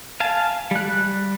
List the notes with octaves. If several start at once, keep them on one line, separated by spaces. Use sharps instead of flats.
F5 G#5 A5
G3 F#6